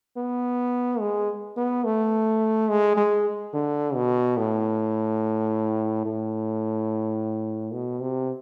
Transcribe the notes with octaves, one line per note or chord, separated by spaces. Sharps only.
B3
G#3
B3
A3
G#3
G#3
D3
B2
A2
A2
B2
C3